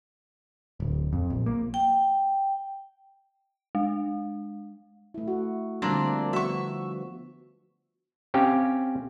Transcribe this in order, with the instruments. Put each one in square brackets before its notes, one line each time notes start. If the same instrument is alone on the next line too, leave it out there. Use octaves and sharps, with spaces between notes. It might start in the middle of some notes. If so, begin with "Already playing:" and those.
[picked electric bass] D1
F2
A#1
A#3
[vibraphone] G5
[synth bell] G#3
[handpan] A3 E4
F#4
[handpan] D3 F3 G3 [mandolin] A#3 C4 D4
[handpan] F3 B3 F#4 [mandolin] E5 C#6
[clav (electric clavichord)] C4 C#4 G4 F5